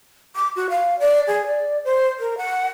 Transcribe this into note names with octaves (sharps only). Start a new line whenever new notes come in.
D6
F#4
F5
D5
G#4
D5
C5
A#4
F#5